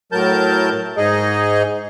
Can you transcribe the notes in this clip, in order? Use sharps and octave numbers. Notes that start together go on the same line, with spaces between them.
A2 F#3 A#4 A5 G6
G#2 D#4 G#4 D#5